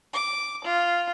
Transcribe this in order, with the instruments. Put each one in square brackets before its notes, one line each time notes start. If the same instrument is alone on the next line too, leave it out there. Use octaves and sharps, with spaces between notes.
[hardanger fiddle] D6
F4